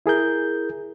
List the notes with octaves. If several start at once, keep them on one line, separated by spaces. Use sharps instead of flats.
E4 G#4 A#4 G6